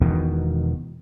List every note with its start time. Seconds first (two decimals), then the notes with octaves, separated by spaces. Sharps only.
0.01 E1 E2 B2 D#3